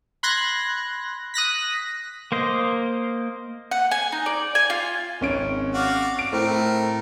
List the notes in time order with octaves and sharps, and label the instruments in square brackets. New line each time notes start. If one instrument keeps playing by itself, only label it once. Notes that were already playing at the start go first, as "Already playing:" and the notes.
[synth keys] B5 C6 F#6 G#6 A#6
D#6 F#6 A#6 B6
[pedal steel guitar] A#3 C5 D#5
[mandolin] F#5
G#5
D#4
D5
G#5
F4
[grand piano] G#1 C#4 D7
[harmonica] F#4 D5 F5
[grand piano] D7
[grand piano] A2 C4 [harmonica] A3 A#4